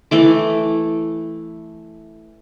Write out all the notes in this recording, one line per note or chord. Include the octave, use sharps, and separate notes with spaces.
E3 A3 D6